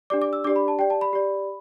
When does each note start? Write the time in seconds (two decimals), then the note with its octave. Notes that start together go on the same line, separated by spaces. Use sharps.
0.10 D4 G4 D5 D6
0.22 D6
0.33 E6
0.44 D4 G4 D5 D6
0.56 B5
0.68 A5
0.79 G4 D5 G5
0.90 A5
1.01 B5
1.13 G4 D5